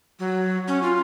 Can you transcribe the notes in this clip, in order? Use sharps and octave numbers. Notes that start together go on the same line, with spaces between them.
F#3
C#4
F4